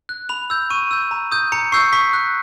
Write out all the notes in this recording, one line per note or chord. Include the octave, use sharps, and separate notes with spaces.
F#6
B5 F7
E6 G6
C#6 D#7
E6 G6
A#5
D#6 G6
A#5 C#7
C#6 E6 G6 C7
C#6 B6
F#6